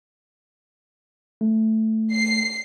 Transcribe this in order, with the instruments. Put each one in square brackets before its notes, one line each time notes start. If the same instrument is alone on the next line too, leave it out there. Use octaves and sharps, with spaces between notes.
[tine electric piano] A3
[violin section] C7